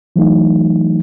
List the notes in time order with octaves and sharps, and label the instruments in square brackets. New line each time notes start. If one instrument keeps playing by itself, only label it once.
[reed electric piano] E3 F#3 A3 D#4